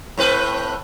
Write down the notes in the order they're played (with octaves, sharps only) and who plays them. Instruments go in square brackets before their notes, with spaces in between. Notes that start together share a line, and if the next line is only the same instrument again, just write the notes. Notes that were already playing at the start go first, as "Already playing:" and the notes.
[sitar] A2 C4 B4